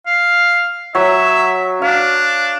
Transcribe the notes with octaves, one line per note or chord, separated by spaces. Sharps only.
F5
F#3 C#5 E5
D4 F5